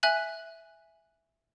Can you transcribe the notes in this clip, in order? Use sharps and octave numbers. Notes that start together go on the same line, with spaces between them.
E5 G#5 F#6 F#7